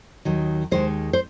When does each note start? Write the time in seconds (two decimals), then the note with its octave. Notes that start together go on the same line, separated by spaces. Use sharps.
0.25 D#2 D#3 F#3
0.71 D#2 D#3 G#3 C5
1.13 C5